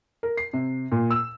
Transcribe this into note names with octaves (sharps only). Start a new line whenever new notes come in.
A#4
C7
C3
A#2
E6